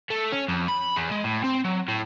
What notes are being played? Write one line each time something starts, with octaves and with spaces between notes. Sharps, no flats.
A3
C#4
F2
B5
E2
G#3
A2
C4
F#3
A2